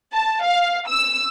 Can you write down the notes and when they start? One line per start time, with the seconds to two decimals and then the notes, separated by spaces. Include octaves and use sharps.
0.14 A5
0.44 F5
0.89 E6